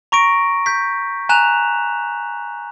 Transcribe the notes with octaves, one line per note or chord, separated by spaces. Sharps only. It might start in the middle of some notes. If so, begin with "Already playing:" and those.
A#5 C#6 A#6 D7
G6 B6
G#5 A#5 F#6 E7 F7